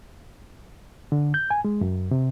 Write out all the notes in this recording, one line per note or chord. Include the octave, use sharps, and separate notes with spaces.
D3
G6
G#5
G#3
F#2
C3